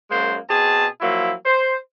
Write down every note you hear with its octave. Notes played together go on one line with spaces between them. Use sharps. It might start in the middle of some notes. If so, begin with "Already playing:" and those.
F#2 G#3 A#3 C5
B2 C4 G#4 A5
F3 F#3 A#3 E4
C5